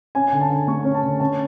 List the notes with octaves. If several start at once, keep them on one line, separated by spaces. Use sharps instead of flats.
C#4 G#5
D3 G#5
A5
D3
A3 C#6
C#4
A5
D3
C#4 A5